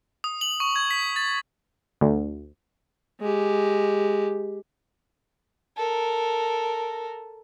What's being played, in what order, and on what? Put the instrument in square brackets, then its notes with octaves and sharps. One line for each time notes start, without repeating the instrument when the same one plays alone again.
[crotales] D#6
F#7
C#6
G#6
B6
A6
[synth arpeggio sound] D2
[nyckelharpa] G#3 G4
[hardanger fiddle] A4 A#4